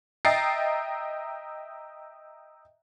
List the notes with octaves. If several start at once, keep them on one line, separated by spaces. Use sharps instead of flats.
D#5 E5 G5 A#5 A6 C7